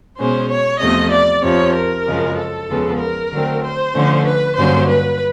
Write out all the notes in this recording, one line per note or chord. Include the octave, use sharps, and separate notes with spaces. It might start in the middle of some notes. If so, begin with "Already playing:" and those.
B2 G#3 C#4 C5
C#5
E2 C3 F3 A3 D#5
D5
F2 C3 F3 C#5
A#4
F#2 C#3 F3 G#3
A4
E2 C#3 F3 G#3 B3
A#4
D3 F#3 A3 C4
C5
D3 F3 A3 C#4
B4
G2 D3 F#3 A#3 C#4 C5
B4